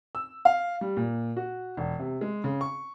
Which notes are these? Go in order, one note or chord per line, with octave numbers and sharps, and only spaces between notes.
E6
F5
G3
A#2
F#4
E1
C3
G#3
C#3
C#6